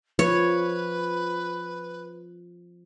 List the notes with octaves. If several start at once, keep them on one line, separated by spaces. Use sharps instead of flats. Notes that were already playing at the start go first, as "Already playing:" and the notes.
F3 B4 C#5